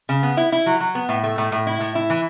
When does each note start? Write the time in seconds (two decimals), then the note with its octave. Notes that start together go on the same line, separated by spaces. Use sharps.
0.09 C#3
0.23 B3
0.37 E4
0.52 E4
0.66 F#3
0.80 F#3
0.95 B3
1.09 A2
1.23 A3
1.38 A2
1.52 A2
1.67 E4
1.80 A2
1.95 E4
2.10 E3